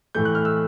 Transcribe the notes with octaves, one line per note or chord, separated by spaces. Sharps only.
A2 E3 A3 G6
F#6
F6
E6